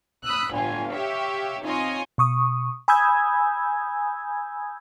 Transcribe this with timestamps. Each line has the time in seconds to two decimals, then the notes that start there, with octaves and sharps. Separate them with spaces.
0.24 B5 D#6 E6 F#6
0.54 G1 A2 F4 G#5
0.91 G4 C#5 E5 F5
1.63 C4 D#4 F4 C#5 D#5 G#5
2.18 B2 C#6 D#6
2.88 G#5 B5 D#6 E6 G6 G#6